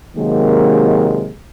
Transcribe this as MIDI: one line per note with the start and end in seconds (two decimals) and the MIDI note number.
0.16 1.31 48
0.16 1.31 51
0.16 1.31 54
0.16 1.31 56
0.16 1.31 58